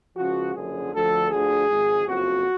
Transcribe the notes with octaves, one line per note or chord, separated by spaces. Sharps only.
C#2 C#3 F3 F#4
F#1 F#2 D3 F3 G#4
D2 D3 F3 A4
D2 D3 F3 G#4
G#1 G#2 F3
F#1 F2 F3 F#4